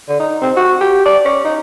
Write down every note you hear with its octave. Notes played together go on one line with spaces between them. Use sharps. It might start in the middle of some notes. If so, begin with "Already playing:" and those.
D3
D#4
C4
F#4
G4
D5
C#4
D#4